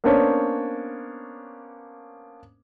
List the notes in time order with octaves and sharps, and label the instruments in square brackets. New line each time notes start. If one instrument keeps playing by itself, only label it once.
[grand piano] A#3 B3 C#4 D4 C5 C#5